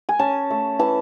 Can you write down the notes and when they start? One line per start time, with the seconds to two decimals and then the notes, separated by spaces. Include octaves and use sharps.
0.09 G#5
0.19 C#4 A5
0.50 A3
0.79 E3 A5